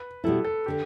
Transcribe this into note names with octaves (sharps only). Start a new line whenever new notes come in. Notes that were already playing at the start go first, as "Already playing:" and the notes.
Already playing: B4
B2 G3 E4 A4
A4
D3 G4